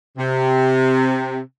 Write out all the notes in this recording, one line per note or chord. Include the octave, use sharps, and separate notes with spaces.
C3